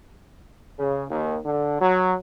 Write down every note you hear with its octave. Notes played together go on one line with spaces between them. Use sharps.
C#3
D#2
D3
F#3